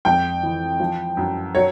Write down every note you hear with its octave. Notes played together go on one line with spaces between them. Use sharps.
F2 G5
E3
F3
F#2
F#3 C#5